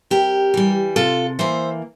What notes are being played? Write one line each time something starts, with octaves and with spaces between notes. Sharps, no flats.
C3 G4 A#4
E3 G3
C3 F4 A4
E3 A#3 C5 E5